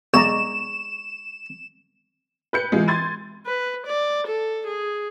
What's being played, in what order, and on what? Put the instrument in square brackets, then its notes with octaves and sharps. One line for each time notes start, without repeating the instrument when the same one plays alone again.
[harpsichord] B1 [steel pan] G#3 D5 A#5 [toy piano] C#6 [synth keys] E7
[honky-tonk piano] B4 G6 C#7
C3 E3 G#3 F4
C6 G#6 A6 D#7
[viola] B4
D5
A4
G#4